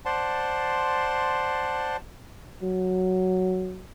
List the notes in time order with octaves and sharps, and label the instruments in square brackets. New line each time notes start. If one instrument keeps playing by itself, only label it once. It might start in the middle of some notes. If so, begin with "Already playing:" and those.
[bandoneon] C5 D5 F#5 A5 C6
[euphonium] F#3